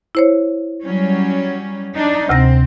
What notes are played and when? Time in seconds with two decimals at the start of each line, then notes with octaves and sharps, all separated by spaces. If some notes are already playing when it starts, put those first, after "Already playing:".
0.15 E4 C5 C#5
0.83 F#3 G3 C#4
1.95 D4 D#4
2.29 D2 C3 C4 A#6